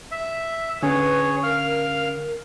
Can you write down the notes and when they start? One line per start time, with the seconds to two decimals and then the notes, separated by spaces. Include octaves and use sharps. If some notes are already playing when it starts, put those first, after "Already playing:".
0.11 E5
0.83 D3 C#4 G#4 B4 C#5
1.43 A#4 F5 F6